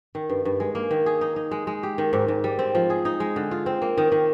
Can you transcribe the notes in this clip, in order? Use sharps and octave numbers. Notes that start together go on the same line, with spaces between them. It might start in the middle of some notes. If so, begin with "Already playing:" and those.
D#3
G2
G2
G#3
A#3
D#3
G#4
D#4
D#4
G#3
G#3
G4
D#3
G#2
G#2
G3
C4
F3
G#4
D#4
G#3
D3
F4
C4
A#3
D#3
D#3